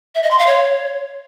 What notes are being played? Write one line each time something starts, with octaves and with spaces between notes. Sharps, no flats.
E5
D#5
C6
F5
C#5